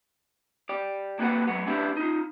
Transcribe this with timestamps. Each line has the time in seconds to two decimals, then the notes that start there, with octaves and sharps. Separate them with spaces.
0.69 G4 D5
1.19 A#3 F#4 G4 A4 B4 F#5
1.47 F#3 A3 B3
1.67 C#4 D4 E4 G4 B4 D5
1.97 D#4 F4